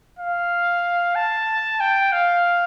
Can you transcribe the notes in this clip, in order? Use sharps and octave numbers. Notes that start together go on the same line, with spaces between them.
F5
A5
G5
F5